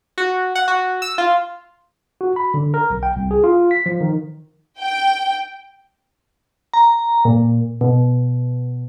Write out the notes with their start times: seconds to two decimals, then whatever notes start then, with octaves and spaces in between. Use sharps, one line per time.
0.18 F#4
0.55 F#5
0.68 F#4
1.02 E6
1.18 F4
2.21 F#4
2.36 B5
2.54 D3
2.74 A#4
2.90 B1
3.03 G5
3.16 C2
3.31 G#4
3.44 F4
3.71 B6
3.86 F3
4.01 D#3
4.79 G5
6.74 A#5
7.25 A#2
7.81 B2